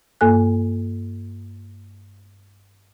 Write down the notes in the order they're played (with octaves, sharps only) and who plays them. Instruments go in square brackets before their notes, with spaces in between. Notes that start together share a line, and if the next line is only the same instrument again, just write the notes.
[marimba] G2 A#3 A4 G#5 F#6